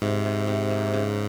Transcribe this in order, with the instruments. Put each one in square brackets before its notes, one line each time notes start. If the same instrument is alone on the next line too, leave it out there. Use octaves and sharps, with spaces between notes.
[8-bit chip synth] G#2 [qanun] C3
[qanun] C3
C3
A#3
C#3